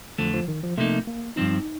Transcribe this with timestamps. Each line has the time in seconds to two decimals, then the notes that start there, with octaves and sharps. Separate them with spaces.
0.18 F2 D3 F3 A3
0.34 F3
0.48 D#3
0.63 F3
0.77 C3 F3 A3 A#3 D#4
1.07 A#3
1.36 G2 F3 C4 D#4